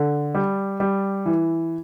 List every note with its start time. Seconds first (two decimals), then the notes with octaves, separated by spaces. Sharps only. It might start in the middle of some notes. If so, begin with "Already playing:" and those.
Already playing: D3
0.35 G3
0.80 G3
1.26 E3